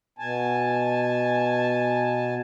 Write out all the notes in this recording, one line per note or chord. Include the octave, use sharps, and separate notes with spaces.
B2 G#5 A5